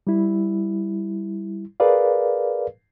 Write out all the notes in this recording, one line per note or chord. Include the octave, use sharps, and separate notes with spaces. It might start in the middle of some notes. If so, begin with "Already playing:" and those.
G3 E4
G#4 A#4 B4 D5 F5